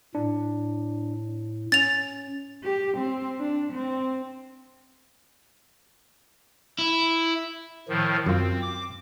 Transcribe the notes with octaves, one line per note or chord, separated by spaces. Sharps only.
A2 D4
C#4 A6 F7
G4
C4
D4
C4
E4
A2 D#3 F3
F#2 C4 F4
D6